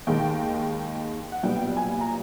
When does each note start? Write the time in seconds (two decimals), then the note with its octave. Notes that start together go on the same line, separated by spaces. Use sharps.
0.07 D#2 D#3 G#3 G5
1.32 F#5
1.43 B1 A#2 G3 B3 G5
1.77 G#5
2.01 A#5